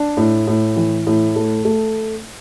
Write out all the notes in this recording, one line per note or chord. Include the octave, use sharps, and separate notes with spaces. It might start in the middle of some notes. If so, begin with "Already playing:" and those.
Already playing: D4
A2
A2
E3
A2
A3
A3